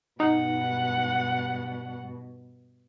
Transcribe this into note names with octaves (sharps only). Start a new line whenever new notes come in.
G2 B2 D#4 F#5